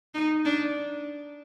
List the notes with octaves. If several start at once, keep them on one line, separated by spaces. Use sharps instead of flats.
D#4
D4